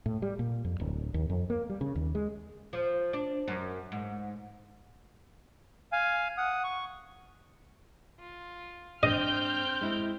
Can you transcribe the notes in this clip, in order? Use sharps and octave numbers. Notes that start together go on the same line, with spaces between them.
A2
G3
A#2
F2
D1
D#2
F2
A#3
G3
C#3
D#2
G#3
F3
D4
F#2
G#2
F5 G#5
F#5 D#6
C#6
F4
G#2 C4 D4 D#5 G5 F6 G6
G#3 E4